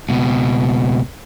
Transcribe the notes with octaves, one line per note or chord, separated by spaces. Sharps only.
C#2 B2